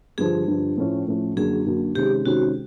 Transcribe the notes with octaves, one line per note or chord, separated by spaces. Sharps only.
G2 D3 F3 G#4
G2 D3 F3
A2 F3 A3 C#4
A2 F3 A3 C#4
F#2 D3 F#3 A#3 G#4
F#2 D3 F#3 A#3
C3 D#3 G#3 C#4 G4
C3 D#3 G#3 C#4 F#4